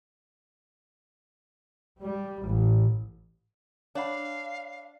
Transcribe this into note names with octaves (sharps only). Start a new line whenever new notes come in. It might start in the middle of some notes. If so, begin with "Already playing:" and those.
G3
A1
D4 C#5 F5 F#5 B5